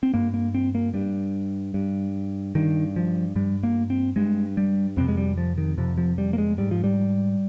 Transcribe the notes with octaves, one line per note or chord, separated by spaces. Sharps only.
C4
G2 A#3
A#3
C4
A#3
G2 G3
G2
G2 D#3
F3
G2 G3
A#3
C4
G2 G#3
G3
F2 C3 C4
G#3
G3
F3
D#3
F2 C3 F3
F3
G3
A#3
G#3
G#2 G3
F3
G3